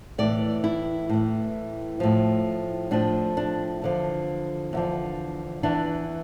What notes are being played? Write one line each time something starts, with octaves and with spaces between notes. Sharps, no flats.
A2 E3 D5
E4
A2 E3
A2 F3
A2 F3 D4
D4
E2 D3 F3
E2 D3 F3
E2 E3 D4